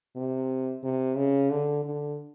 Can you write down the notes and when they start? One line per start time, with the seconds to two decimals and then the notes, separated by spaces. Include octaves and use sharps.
0.16 C3
0.83 C3
1.16 C#3
1.50 D3
1.84 D3